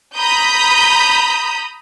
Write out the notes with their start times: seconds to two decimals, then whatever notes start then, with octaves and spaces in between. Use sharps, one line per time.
0.16 A#5 B5 D#6 G6